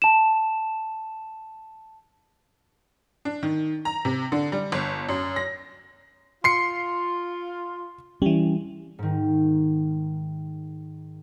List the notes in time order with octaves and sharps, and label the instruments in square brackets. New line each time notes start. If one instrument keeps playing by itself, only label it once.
[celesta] A5 E7
[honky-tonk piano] D4
D#3
A#5
C3
D3
G3
G1
F#2
A#6
[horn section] F4 [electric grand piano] C6 C7 C#7
[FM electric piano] E3 G3 [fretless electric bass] C#4
[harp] G#2 D#3